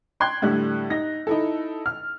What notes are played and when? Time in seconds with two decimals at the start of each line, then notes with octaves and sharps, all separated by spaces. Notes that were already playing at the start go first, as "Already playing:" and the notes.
0.20 G5 C6 F#6 G#6
0.42 A2 D3 G3 F#6
0.90 D#4 A#6
1.27 D#4 E4 A4
1.86 F6